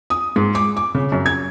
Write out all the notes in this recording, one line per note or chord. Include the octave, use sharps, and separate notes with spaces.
D#6
G#2
D6
D6
C#3
F#2
G#6